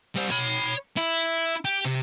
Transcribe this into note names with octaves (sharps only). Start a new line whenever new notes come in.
G3 C5
C#5 B5
E4
G4
C3